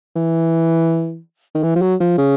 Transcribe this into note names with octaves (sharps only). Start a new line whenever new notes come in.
E3
D#3
E3
F3
F#3
F3
C#3